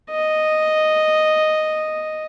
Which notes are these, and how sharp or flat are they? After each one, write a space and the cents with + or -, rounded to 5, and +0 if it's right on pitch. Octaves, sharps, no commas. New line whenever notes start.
D#5 -5